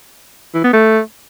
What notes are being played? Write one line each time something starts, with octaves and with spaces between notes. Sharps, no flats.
E3
B3
A3